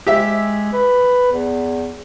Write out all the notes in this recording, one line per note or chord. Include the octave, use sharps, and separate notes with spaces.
G#3 G4 E5
B4
E2